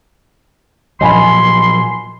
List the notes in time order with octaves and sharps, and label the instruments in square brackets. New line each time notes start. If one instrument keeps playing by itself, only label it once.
[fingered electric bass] A#2 F3 F#3 [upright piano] D#5 G#5 B5 [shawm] C6